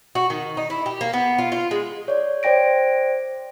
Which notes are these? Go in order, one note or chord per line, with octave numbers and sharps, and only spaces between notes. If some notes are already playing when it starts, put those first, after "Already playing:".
F#4
D#3
D#4
E4
G4
A#3
B3
F4
F4
G#3
C#5 D5
C5 D5 G5 A#6 D7